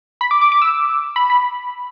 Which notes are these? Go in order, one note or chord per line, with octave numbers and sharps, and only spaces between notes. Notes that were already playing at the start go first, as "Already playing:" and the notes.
B5
D6
D6
D6
E6
B5
B5